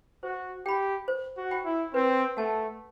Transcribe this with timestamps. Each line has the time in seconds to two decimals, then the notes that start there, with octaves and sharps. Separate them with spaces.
0.23 F#4 C5
0.65 G4 G5 B5
1.08 C5
1.37 F#4
1.51 G5 B5
1.65 E4
1.94 C4 B4
2.37 A3 F#5 A5